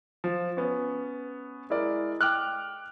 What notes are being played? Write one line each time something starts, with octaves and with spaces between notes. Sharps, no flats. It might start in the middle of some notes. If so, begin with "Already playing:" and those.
F3
B3 C#4
G#3 E4 A#4 D5
G5 D6 F6 F#6